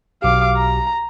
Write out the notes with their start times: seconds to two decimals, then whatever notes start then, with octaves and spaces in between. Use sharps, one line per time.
0.22 B1 F#4 G4 F5 D6
0.57 A#5